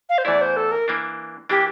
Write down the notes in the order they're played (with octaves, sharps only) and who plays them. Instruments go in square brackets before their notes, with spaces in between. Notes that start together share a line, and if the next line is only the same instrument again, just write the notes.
[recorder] F5
C5
[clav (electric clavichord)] E2 E3 A3 E4 [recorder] D5
[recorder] C5
A4
A#4
[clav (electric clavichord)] E3 A#3 D4
[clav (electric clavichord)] E3 A#3 D4 [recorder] G4